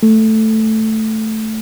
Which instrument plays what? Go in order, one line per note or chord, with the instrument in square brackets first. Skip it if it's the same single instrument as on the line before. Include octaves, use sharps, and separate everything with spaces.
[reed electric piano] A3